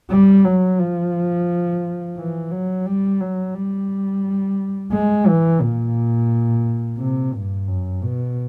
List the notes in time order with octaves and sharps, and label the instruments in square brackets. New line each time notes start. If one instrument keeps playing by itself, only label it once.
[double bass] G3
F#3
F3
E3
F#3
G3
F#3
G3
G#3
E3
A#2
C3
G2
F#2
B2